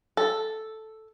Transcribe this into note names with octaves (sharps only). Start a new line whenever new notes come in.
A4